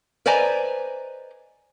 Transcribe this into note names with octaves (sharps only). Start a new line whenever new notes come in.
B4 C5 D5 D#5 G#5 A#5